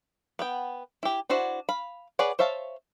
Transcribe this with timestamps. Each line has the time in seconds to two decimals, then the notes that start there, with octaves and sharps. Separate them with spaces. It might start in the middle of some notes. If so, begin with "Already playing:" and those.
0.39 B3 F#5 G5
1.03 E4 G4
1.30 D4 E4 F#4 C5 F#5
1.69 F5 B5
2.19 G#4 B4 C#5 D5 F#5
2.39 C5 C#5 E5 F5 A5